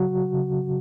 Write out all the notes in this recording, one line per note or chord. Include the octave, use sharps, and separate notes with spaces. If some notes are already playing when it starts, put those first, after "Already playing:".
Already playing: C#3 F#3 F#4
C#3